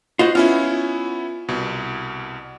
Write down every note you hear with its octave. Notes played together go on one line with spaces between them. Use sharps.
F4 F#4 C5 D#5
B3 C#4 E4 F4
C2 B2